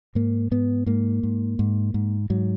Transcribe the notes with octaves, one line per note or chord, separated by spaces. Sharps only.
G#2 A#3
G#2 B3
G#2 A#3
G#2
G#2
G#2
G#2 F#3